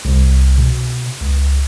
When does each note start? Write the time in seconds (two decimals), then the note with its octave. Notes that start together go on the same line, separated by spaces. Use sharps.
0.05 C2
0.58 B2
1.21 C#2